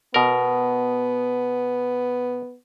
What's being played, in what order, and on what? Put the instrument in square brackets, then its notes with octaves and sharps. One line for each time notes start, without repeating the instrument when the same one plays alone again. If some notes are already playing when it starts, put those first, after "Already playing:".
[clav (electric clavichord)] B2 A#4 [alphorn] B3